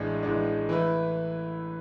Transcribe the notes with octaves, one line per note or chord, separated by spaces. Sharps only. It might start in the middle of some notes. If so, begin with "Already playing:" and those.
Already playing: A1 A2 G#3 D4
A1 A2 G#3 D4
E3 A3 E4 B4